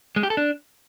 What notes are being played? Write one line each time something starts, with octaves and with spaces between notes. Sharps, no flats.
G#3
G4
A4
D4